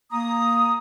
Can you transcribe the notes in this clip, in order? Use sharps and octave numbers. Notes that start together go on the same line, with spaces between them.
A#3 A#5 D#6